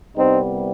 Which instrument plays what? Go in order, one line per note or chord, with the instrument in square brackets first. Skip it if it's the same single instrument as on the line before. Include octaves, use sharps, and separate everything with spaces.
[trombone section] C2 C3 G3 B3 C4 D#4